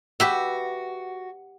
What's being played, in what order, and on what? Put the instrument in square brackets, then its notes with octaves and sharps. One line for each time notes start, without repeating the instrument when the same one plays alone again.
[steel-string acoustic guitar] F#4 [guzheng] G4 B4 E5